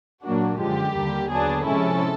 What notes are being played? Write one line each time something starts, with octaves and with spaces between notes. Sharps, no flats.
A#2 F#3 A#3 D4 F#4
F#2 D3 F3 G#3 G4
D#2 D3 G3 A#3
D#2 D3 F#3 B3 D4 G#4
C3 F3 G#3 C#4 E4 A4